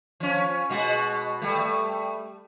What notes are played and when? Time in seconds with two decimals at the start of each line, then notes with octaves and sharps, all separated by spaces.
0.20 F3 C#4
0.70 B2 G#3 F#4
1.42 G3 A3